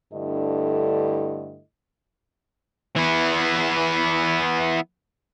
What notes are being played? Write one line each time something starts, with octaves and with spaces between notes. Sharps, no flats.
G2 D3 A3 E4 A4 D#5
E3 B3